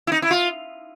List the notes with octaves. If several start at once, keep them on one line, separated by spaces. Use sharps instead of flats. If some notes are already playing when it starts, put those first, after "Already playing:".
E4
D#4
E4
F4